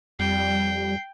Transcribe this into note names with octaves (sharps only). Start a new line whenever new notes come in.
F2 G3 G5 C7